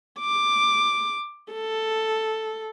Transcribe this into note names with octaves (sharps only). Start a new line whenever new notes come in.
D6
A4